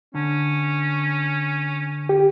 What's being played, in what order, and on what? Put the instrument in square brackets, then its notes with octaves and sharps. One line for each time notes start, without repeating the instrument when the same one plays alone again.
[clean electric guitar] D3 [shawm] C#4
[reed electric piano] G4